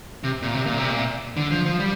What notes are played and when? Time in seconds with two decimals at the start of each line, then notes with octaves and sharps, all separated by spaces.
0.24 C3
0.42 A#2
0.54 C3
0.66 A#2
0.78 C3
0.90 A#2
1.37 D3
1.51 F3
1.65 F3
1.79 G3